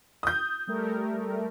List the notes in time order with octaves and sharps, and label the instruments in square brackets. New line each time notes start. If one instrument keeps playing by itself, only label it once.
[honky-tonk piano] D#6 G6
[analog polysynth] G3 A3 A#4